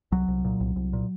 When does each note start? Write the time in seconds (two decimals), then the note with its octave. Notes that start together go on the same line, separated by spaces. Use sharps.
0.12 C2 F#3
0.28 C2
0.44 A#2
0.60 C2
0.76 C2
0.93 A#2